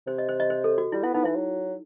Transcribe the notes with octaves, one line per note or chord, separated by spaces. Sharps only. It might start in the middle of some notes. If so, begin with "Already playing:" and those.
C3 C5
D#5
C5
D#5
C5
A4
F#4
G3 E4
B3 E4
B3 D#4
E3 E4
F#3